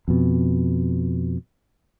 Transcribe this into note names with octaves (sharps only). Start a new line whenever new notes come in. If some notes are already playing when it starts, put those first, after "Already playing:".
F2 B2